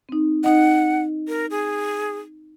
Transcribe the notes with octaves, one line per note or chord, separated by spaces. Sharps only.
C4 D#4
D#4 D#5 F#5
A#4
G#4